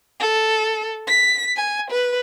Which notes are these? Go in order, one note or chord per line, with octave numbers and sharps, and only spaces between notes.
A4
B6
G#5
B4